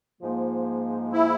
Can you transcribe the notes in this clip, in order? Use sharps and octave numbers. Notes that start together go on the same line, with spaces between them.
G#2 F3 A#3
E4